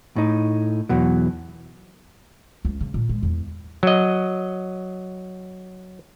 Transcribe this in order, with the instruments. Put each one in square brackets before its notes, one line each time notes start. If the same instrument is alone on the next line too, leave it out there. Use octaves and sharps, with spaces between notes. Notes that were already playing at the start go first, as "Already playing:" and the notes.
[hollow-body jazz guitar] A2 D#4
E2 B2 F#3
[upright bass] C#2
C#3
A#2
G#3
E2
[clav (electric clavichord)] F#3 D#5